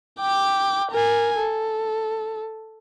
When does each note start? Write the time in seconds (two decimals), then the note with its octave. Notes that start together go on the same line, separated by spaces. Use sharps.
0.20 G5 D6
0.91 A#4 G#5
1.39 A4